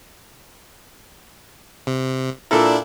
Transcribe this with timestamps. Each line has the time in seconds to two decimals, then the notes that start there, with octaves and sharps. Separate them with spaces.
1.87 C3
2.51 A#2 D4 E4 A4 A#4